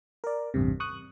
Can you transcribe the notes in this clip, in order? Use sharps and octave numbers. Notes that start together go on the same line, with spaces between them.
A#4 D5
A1 E2 G2 C3
C#6 D#6 F#6